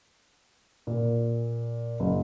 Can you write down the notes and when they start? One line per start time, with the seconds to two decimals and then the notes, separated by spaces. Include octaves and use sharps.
0.87 A#2
2.00 F#1